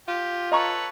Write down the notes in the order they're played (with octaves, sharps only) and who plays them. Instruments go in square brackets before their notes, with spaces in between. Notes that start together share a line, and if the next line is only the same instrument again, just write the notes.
[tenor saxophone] F4 [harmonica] G4
[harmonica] A4 B4 C#5 [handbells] D#5 A#5 C#6